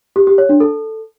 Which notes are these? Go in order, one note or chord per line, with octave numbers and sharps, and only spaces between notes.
G4
G4
C#5
D4
A4